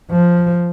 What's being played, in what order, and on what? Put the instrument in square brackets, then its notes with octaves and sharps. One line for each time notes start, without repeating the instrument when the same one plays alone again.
[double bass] F3